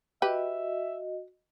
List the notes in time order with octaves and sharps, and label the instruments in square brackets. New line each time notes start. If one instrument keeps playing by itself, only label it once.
[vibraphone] F#4 D#5 [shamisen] G4 B4 [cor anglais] E5